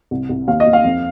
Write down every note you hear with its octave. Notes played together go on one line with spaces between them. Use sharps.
C2
C2
D#2 F5
D#5
D#2
F5
F2